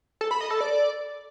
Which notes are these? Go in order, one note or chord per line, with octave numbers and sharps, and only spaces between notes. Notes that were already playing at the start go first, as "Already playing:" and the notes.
A4
B5
D#5
A4
D5